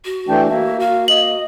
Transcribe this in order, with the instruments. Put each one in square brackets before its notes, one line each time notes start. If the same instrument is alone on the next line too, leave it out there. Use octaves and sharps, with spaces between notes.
[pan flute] F#4
[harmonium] E3 A3 D4 [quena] G5
[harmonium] A#3 [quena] E4
[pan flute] F#4 [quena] F5
[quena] D#5 [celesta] F#7